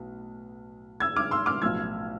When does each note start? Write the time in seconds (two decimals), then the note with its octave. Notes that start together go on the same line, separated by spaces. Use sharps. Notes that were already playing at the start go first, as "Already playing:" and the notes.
Already playing: B1 A2
1.00 E6 G#6
1.16 D6 F6
1.31 C6 E6
1.46 D6 F6
1.61 B1 A2 F3 E6 G#6